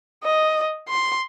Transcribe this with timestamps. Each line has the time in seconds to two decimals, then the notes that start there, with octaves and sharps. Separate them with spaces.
0.24 D#5
0.89 C6